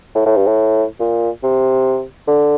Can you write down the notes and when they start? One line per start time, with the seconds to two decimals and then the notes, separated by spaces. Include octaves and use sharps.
0.15 A2
0.26 A2
0.37 G2
0.47 A2
1.00 A#2
1.43 C3
2.28 D3